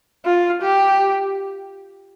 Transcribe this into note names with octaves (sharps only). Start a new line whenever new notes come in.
F4
G4